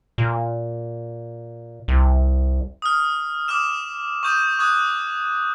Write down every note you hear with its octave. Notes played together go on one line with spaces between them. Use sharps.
A#2
C2
D#6 F6
D6 D#6 F6 E7
C#6 D#6 G6 D#7
C#6 D#6 F#6 G#6